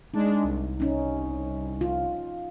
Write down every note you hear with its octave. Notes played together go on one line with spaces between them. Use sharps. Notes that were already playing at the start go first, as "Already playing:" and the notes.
G#3 D4 D#4
C2
C#4 D#4
F4